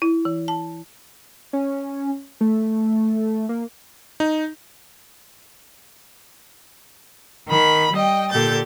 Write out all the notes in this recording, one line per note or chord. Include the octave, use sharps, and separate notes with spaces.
E4
E3
A5
C#4
A3
A#3
D#4
D#3 B5
G3 D#5 G5
A#2 D3 G4 A4 G6 A6